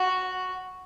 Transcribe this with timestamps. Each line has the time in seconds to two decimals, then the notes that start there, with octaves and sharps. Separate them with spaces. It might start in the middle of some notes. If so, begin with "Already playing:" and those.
Already playing: F#4